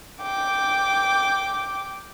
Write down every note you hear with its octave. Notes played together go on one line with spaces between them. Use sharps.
G5 D6